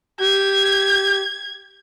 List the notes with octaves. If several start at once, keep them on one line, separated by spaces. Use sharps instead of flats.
G4 G#6